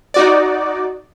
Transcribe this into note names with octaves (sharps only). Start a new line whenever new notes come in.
D#4 F#4 D5